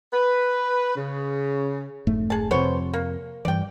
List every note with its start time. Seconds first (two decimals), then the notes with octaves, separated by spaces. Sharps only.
0.13 B4
0.96 C#3
2.07 F1 G#2 A3
2.30 G#4 A5
2.51 F2 C3 B3 C5 C#5
2.93 A#3
3.45 G2 E3 D5 G5